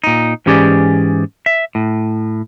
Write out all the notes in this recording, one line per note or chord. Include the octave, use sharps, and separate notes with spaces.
A#2 D#4
G#2 E3 C#4 G4 G#4 D5
E5
A2